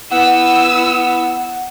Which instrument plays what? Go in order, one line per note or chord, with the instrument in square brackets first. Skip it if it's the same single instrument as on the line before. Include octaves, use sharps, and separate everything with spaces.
[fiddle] B3 [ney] E4 [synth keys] F#5 [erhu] E6